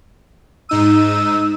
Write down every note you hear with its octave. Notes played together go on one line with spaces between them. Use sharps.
G#2 D#4 E6 D#7